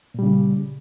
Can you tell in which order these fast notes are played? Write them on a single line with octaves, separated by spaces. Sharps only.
A#2 G3 C#3